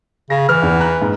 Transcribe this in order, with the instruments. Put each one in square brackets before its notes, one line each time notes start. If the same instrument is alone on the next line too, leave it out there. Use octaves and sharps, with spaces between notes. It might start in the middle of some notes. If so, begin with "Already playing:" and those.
[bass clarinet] C#3 [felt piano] A#6
[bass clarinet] E3 [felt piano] F6
[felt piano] E2
A#5 F#6
G#2